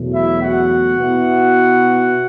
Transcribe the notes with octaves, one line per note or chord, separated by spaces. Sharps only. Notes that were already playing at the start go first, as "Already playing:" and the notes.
Already playing: E2 B2 F#3 A3
E4 E5
F#4 F#5
B2 B3 E4